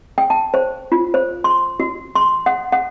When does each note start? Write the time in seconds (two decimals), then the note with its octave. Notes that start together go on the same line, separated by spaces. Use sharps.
0.18 G5
0.30 A5
0.54 C5
0.92 F4
1.14 C5
1.44 C6
1.80 F#4
2.15 C6
2.46 F#5
2.72 F#5